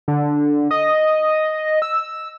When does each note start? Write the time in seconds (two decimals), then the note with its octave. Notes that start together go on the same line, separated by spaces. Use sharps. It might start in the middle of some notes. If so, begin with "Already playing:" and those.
0.08 D3
0.71 D#5
1.82 E6